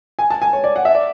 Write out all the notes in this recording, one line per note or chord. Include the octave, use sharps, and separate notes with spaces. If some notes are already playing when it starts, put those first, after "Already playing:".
G#5
A5
G#5
C#5
D5
F#5
E5
D5